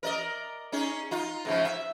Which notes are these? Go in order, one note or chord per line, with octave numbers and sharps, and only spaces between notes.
A#4 D5 D#5
C#4 D#4 G#4
D#4 F4
G#2 C#3 F3
E5